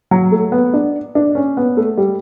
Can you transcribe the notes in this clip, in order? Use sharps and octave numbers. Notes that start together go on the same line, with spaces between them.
F#3
A3
B3
D4
D4
C#4
B3
A3
G3